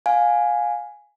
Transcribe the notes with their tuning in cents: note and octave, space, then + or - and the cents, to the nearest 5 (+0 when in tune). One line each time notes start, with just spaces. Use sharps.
F5 +20 G#5 +0